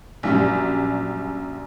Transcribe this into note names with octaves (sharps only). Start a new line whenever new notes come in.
A#1 F#2 G3